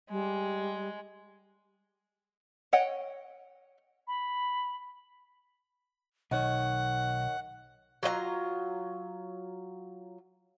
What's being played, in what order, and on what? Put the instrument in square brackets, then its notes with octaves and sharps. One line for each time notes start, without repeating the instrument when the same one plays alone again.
[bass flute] G3 [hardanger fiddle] G#3
[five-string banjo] C#5 D#5 F#5 G5
[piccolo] B5
[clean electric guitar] B1 [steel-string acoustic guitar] D#3 C#5 [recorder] F#5
[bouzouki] F#3 F4 D#5 A#5